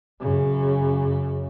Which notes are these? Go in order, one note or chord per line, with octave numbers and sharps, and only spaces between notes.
F#2 C#3